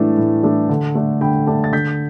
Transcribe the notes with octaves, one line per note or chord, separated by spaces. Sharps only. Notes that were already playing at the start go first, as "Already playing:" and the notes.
Already playing: A2 E3 A3 D4 A5
A2
E3 A3 D4
D3
A3 D4
D3 G5 B5
A3 D4 A5 D6
A6
D3 G6 B6